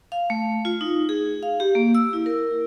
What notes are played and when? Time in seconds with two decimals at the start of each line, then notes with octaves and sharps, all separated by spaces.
0.12 F5
0.30 A3
0.65 F4
0.81 D#4
1.09 G#4
1.43 F5
1.60 G4
1.75 A#3
1.95 E6
2.13 E4
2.26 A#4